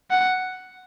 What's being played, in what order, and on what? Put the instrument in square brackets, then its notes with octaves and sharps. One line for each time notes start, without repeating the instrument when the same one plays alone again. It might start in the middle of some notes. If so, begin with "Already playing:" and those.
[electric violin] F#5